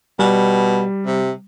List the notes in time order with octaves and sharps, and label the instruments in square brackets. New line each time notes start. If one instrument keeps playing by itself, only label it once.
[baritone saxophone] B2 [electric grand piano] G3
[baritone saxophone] C3